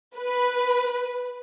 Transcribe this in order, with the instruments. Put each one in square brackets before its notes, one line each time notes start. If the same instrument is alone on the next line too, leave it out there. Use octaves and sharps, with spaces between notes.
[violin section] B4